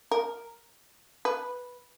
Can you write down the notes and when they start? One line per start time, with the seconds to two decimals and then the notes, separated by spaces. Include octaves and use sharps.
0.11 A#4
1.25 B4